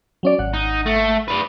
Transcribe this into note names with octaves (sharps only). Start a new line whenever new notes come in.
F#3 C#4 D5
G#1 F#5
D#4
A3
B4 D5